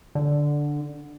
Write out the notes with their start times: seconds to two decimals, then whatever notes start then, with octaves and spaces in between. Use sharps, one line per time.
0.15 D3